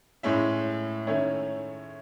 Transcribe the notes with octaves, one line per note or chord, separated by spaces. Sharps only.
A2 G#3 C#4 E4 E5
D#3 A3 C#4 E4 C#5